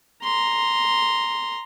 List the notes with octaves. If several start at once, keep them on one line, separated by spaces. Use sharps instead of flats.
A#5 C6